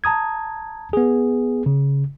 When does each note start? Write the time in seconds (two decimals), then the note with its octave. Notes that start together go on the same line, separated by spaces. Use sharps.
0.04 A5 A#5 D#6 G#6
0.93 B3 G#4
1.66 C#3